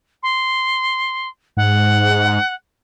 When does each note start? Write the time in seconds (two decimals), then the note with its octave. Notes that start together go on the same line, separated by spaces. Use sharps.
0.23 C6
1.57 G#2 F#5